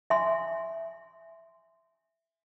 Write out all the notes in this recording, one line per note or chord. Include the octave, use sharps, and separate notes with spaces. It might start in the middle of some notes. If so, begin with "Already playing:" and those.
E5 G#5 C6